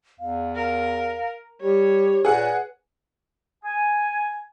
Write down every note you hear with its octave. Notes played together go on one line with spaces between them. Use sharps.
E2 F5
A#4 F5
G3 G4 C#5
A#2 G#4 B4 F#5
G#5